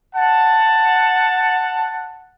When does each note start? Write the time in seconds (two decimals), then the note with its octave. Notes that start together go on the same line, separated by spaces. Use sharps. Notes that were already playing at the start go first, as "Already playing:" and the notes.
0.16 F#5 A5